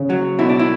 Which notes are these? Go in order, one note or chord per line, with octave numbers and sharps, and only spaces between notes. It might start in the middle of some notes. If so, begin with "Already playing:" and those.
Already playing: C#3 C#4
F#3
B2 E4
D4
E4